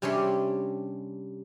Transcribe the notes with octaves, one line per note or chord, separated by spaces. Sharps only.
C3 G3 C#4 D4 C#5 C6